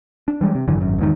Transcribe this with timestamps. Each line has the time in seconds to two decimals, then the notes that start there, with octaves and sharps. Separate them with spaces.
0.28 D4
0.41 E3 G3 G#3
0.55 C3
0.68 G#1 F#2 D3 E3
0.81 G#1 F#2
0.98 E2 G#2 D#3